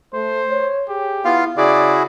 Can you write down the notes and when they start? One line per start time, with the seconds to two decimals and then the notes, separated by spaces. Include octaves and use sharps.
0.13 A3 C5
0.51 C#5
0.88 G4 G#4
1.25 B3 E4 F4 F5
1.57 C#3 E4 F#4 G#4 D5